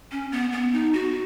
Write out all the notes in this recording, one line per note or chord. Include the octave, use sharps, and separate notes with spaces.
C#4
B3
B3
D#4
F#4